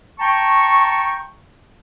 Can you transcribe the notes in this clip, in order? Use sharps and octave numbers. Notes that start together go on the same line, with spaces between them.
G5 A5 A#5 C#6